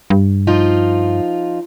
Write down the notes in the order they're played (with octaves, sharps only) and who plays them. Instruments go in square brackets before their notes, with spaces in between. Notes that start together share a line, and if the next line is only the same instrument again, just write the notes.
[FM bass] G2
[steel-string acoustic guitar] F3 D#4 F4